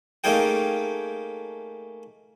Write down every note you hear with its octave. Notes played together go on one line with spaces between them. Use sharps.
A3 A#3 C#4 D#4 G#4 G5